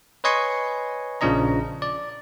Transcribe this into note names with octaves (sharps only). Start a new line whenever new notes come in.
B4 C#5 D#5 G#5 C6 C#6
A#1 C#3 F3 D4 D#5 A#5
D5